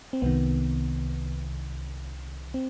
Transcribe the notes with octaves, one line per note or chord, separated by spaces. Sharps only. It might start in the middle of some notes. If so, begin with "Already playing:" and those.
C4
C2 C3 D#3 B3
C4